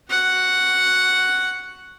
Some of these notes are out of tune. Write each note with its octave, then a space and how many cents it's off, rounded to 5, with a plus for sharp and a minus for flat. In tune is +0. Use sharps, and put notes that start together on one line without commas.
F#4 +0 F#5 +0